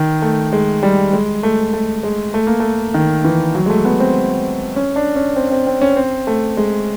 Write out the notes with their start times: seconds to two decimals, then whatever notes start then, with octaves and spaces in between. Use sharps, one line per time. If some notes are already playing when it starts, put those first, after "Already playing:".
Already playing: D#3
0.22 A3
0.53 G#3
0.83 G3
1.13 G#3
1.43 A3
1.73 A3
2.03 G#3
2.34 A3
2.47 A#3
2.60 A3
2.94 D#3
3.25 E3
3.55 F#3
3.66 G#3
3.70 A3
3.85 B3
4.00 C4
4.76 C#4
4.96 D4
5.16 C#4
5.36 C4
5.51 C4
5.67 C4
5.82 C#4
5.97 C4
6.27 A3
6.57 G#3